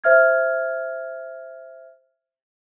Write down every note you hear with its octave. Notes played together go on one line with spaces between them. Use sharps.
C5 E5 F6 G#6